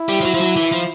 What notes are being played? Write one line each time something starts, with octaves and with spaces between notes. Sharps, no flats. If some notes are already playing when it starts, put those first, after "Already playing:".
Already playing: E4
G3
F3
F#3
F3
F#3
E3
F3